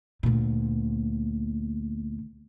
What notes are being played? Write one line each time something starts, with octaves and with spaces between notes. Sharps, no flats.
D2 A#2